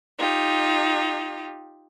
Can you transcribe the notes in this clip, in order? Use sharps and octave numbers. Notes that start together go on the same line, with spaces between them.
D#4 F4 G4